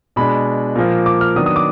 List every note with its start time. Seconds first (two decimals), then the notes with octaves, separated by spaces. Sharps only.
0.16 B2 G#3 D4 B5
0.76 A#2 F3 A#3
1.06 D6
1.21 F6
1.36 D#3 F#3 B3 D4 D#6
1.46 D#6
1.56 D6